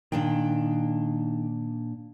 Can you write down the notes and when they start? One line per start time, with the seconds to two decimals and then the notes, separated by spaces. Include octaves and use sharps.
0.12 A#2 D#3 D4 G5